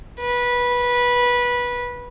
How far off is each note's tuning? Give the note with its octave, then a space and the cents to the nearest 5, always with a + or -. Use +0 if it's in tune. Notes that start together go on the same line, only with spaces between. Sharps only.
B4 -15